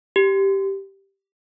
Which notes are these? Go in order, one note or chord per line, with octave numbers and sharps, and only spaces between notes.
G4